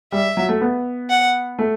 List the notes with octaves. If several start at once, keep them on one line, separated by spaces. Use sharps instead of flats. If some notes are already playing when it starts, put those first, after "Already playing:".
G3 E5
F#3
A3
B3
F#5
A3